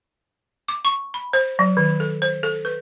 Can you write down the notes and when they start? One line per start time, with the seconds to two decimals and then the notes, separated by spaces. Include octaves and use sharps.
0.68 D6
0.85 C#6
1.14 B5
1.33 C5
1.59 F#3
1.77 D#3
2.00 A4
2.22 C5
2.43 A4
2.65 B4